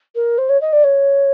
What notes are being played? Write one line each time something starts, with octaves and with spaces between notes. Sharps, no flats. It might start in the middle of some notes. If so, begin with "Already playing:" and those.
A#4
C5
C#5
D#5
D5
C#5